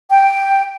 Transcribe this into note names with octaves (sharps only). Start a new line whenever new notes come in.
G5